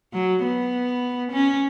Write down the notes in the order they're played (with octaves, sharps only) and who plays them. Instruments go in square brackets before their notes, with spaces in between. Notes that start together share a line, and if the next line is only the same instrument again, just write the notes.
[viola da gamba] F#3
B3
C#4